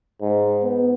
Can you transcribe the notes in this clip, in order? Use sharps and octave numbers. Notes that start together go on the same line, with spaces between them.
G#2
B3